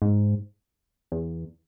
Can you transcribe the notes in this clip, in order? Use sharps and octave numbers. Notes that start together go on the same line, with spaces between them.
G#2
E2